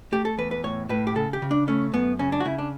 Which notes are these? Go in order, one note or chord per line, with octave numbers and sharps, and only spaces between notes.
A3 G4
A4
E2 B4
B4
A2 C#5
A2 B4
G4
C#3 A4
G4
C#3
D4
A3 C#4
F#2 B3
C#3 C#4
D4
F#4
C#3 E4
D4